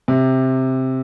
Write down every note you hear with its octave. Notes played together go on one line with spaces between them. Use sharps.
C3